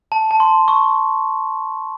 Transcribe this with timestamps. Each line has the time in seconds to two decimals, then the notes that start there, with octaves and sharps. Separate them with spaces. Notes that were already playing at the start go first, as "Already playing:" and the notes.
0.12 A5
0.31 A5
0.40 C6
0.68 C#6